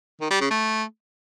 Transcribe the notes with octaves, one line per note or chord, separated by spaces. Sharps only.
D#3
G3
C#3
A3